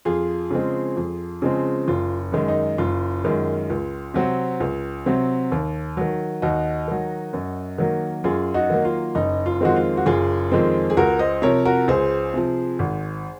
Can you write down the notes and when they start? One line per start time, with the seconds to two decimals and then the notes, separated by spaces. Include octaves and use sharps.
0.05 F2 F4 G#4
0.51 C#3 F3 G#3 C4
0.97 F2
1.42 C#3 F3 G#3 C4
1.88 F#1 F4
2.32 F#2 D#3 G#3
2.48 D#4
2.78 F#1 F4
3.24 F#2 D#3 G#3
3.70 C#2
4.14 C3 F#3 C4
4.60 C#2
5.06 C3 F#3 C4
5.52 D#2
5.97 D#3 F#3
6.42 D#2 D#4 F#4
6.88 D#3 F#3
7.33 F#2
7.78 D#3 F#3 A#3
8.24 F#2 F4 G#4
8.54 D#4 F#4
8.70 D#3 F#3 A#3
8.85 F4
9.15 F#1 D#4
9.46 F4
9.61 F2 D#3 G#3 C4 F#4
9.76 F4
9.97 F#4
10.06 F#1 F4 G#4
10.51 F2 D#3 G#3 C4
10.90 G#4
10.97 C#2 F#4 A#4
11.19 C5 D#5
11.42 C3 F3 A#4 C#5
11.65 F#4 A#4
11.88 C#2 G#4 C5
12.34 C3 F3
12.79 G#1